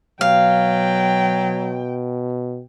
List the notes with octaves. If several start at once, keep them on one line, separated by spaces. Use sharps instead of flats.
B2 F#3 F5 G5